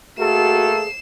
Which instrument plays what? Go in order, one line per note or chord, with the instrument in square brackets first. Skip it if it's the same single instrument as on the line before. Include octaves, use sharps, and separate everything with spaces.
[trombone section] A3 A#3 A4 [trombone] F#4 [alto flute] G#4 [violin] C7 E7